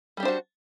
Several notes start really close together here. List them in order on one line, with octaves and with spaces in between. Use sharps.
G3 G4 D4 C5 F#4